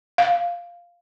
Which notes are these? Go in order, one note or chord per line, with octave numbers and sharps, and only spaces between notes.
F5